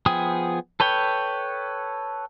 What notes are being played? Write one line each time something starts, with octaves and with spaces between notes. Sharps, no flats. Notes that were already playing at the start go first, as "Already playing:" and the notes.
F3 B3 G#4 G5 D#6
A4 B4 C#5 G5